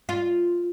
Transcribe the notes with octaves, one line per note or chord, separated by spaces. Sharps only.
F4